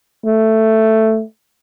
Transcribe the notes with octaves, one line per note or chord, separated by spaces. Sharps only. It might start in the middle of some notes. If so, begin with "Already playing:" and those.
A3